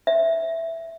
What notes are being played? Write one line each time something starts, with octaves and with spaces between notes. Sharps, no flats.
E5